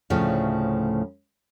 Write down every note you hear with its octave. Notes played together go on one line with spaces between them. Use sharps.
D2 A2 C#3 F3 C#5 F5